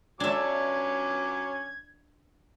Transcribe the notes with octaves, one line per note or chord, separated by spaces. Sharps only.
F#3 C#4 D4 E5 D6 G#6